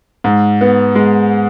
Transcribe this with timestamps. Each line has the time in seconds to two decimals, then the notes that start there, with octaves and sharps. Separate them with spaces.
0.24 G#2
0.61 B3
0.95 G#3